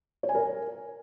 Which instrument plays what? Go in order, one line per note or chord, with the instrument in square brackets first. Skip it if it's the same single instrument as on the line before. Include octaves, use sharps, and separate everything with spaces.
[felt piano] C#5
G#5
A#4